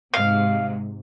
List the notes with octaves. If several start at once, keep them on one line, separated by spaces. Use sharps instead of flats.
G#2 C3 F5